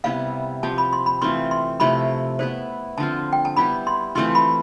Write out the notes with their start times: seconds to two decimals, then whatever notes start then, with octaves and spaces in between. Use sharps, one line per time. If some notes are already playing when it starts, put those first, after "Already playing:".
0.04 C3 G3 B3 E4 F5
0.63 F3 C4 G4 A5
0.78 B5
0.93 C6
1.06 B5
1.22 E3 A3 C4 F4 C6
1.51 C6
1.80 C3 F3 A3 E4 B5
2.39 B3 E4 B4 C5
2.98 D3 F3 C4 F4 A5
3.33 G5
3.45 A5
3.56 G3 B3 E4 G4 B5
3.87 C6
4.15 E3 A3 C4 F4 C6
4.35 B5